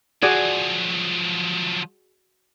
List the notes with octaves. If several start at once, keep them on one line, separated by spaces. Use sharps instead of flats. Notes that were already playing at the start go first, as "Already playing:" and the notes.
F3 F#3 F#4 G#4 D5